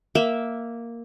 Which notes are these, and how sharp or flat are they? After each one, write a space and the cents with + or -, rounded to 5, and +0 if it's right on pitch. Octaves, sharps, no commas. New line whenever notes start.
A#3 +0 E5 -5